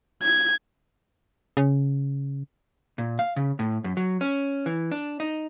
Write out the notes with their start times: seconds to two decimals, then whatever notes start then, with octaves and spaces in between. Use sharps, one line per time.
0.23 G#6
1.57 C#3
2.98 A#2
3.19 F5
3.36 C#3
3.59 A2
3.84 F#2
3.97 F#3
4.21 C#4
4.66 E3
4.91 D4
5.20 D#4